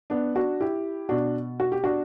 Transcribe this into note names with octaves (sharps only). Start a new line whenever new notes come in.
B3 D4
D4 F#4
E4 G4
B2 D4 F#4
F#4
G4
D4 F#4